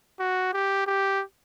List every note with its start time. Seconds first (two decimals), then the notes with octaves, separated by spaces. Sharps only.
0.20 F#4
0.53 G4
0.87 G4